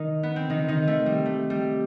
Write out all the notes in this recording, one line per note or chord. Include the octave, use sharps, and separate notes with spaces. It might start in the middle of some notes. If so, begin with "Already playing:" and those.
Already playing: D#3 D#4
B3
C4
D#3 D#4
D#3 D#4
A3
G3
A3
G3